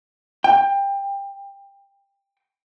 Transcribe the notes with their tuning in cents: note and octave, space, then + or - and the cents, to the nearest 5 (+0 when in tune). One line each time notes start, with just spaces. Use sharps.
G5 +20